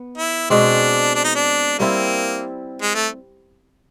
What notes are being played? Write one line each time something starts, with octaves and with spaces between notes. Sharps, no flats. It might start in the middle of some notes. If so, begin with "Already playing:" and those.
Already playing: B3
E4
B2 G#3 C4 D4
D4
D#4
D4
G3 A#3 C4 E4
G#3
A3